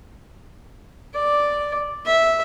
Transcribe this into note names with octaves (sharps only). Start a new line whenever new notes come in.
D5
E5